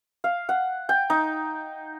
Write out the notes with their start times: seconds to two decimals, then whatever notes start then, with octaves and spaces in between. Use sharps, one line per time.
0.24 F5
0.49 F#5
0.89 G5
1.10 D#4